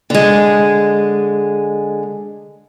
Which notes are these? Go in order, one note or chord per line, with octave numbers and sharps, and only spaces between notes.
D3 G#3